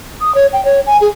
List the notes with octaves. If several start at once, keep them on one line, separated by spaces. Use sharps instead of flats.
D#6
C#5
G5
C#5
G#5
G#4